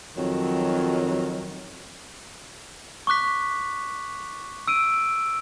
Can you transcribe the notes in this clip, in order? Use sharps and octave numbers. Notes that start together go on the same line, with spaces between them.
F2 D#3 F#3
C#6 D6 F#6 B6
E6 D7 D#7